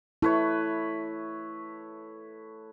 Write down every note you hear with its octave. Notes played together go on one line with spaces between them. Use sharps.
A3 E4 B4 C#5